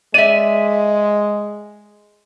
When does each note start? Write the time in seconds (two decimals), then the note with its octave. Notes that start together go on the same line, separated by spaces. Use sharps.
0.14 G#3 D5 E5 D#7